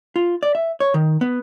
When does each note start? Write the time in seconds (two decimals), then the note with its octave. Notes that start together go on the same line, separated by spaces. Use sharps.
0.16 F4
0.43 D5
0.55 E5
0.80 C#5
0.94 D#3
1.21 B3